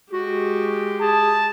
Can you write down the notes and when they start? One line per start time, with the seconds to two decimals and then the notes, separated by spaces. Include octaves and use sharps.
0.13 G#3 F#4 G4
1.01 G#4 A5